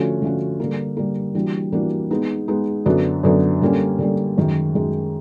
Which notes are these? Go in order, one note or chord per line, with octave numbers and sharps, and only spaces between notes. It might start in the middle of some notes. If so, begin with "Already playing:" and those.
Already playing: D3 F3 A3 C#4 F#4
D3 F3 A3 C#4 F#4
D3 G3 A#3
D3 G3 A#3
E3 G3 A#3 D4 F#4
E3 G3 A#3 D4 F#4
G#3 B3 D#4
G#3 B3 D#4
F#2 D3 F#3 B3 D4
F#2 D3 F#3 B3 D4
D3 G3 A#3 C#4
D3 G3 A#3 C#4
F#2 D#3 G#3
F#2 D#3 G#3